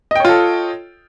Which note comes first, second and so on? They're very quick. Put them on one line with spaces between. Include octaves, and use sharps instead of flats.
D#5 G5 C#5 F4 A4